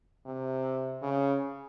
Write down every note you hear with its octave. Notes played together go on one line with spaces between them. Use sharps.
C3
C#3